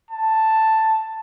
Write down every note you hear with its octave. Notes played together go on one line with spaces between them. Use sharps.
A5